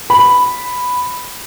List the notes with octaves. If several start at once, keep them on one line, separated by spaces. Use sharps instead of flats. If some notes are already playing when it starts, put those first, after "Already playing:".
B5